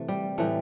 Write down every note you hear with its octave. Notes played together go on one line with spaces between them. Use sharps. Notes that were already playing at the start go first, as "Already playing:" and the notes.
Already playing: C3 E3 A3
G3
A2 E3 G3 A3